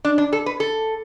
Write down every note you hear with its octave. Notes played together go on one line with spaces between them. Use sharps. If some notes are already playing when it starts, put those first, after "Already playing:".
D4
D4
A4
B4
A4